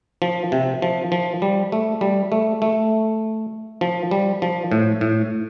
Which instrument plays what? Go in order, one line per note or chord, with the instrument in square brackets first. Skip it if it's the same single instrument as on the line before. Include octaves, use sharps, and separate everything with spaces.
[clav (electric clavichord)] F3
C3
F3
F3
G3
A3
G3
A3
A3
F3
G3
F3
A2
A2